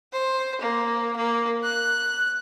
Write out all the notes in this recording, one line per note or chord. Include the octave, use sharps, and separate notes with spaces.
C5
A#3
A#3
F#6